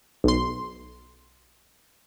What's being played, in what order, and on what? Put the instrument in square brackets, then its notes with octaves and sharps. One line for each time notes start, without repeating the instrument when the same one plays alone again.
[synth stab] B1 C6